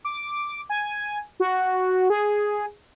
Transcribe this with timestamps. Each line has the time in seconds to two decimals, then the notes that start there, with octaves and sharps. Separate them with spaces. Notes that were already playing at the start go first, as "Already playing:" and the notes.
0.05 D6
0.70 G#5
1.40 F#4
2.10 G#4